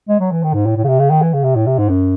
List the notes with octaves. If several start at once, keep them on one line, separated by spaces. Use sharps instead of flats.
G#3
F#3
E3
D#3
G#2
A2
A2
C#3
C3
C#3
D#3
E3
C#3
C3
A2
C3
G#2
F#2